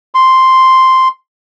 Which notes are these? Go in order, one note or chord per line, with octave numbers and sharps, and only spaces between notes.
C6